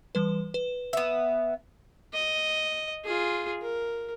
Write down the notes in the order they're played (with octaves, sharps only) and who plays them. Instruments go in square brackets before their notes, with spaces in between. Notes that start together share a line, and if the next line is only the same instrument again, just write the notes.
[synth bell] E3 G3 B4
B4
[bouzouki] B3 E5
[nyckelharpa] D#5
F4 G#4
A#4